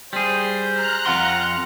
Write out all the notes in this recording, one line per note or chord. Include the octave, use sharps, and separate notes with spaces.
G3 G#4 C5
A#5 F6 F#6
F2 F5 F#5 C6